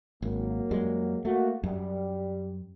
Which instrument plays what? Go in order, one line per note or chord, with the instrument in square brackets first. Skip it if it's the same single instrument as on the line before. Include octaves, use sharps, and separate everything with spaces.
[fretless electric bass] G#1 [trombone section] F#3 A#3
[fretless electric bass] F#2 G3 G#3
[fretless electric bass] A3 [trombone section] A#3 F#4
[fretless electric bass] F#2 [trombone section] G3